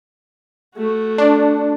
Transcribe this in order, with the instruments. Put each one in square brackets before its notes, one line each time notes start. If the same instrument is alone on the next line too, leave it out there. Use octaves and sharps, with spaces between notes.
[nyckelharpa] A3 F#4
[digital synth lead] D4